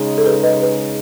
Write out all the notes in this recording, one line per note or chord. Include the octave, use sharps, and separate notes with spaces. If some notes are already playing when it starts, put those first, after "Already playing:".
Already playing: C#3 G#3 D#4
A4
G#4 B4
B4 D#5
G#4 B4